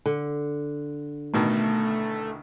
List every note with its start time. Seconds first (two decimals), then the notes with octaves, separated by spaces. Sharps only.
0.06 D3
1.34 A1 B2 D#3 A3